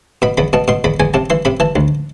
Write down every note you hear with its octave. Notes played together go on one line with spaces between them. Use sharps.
B2 B5
E2 B5
B2 A5
B2 C6
E2 B5
E2 G#5
C3 A5
E3 C6
C3 B5
E3 A5
D2